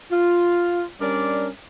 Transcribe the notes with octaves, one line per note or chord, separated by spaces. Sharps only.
F4
G3 C#4 D4 A#4 D5